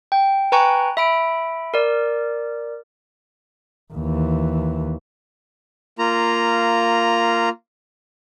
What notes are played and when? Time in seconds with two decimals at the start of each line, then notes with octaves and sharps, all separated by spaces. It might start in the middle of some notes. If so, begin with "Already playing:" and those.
0.12 G5
0.52 B4 G5 G#5 A#5 C#6 F#6
0.97 E5 B5 D7
1.74 A#4 D5
3.94 D#2 E3
5.99 A#3 F4 A#5